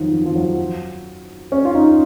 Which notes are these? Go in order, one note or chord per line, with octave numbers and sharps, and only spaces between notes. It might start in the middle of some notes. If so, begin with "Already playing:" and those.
Already playing: D#3 F3 F#3
F3
F3
F#3
C#4
F4
D#4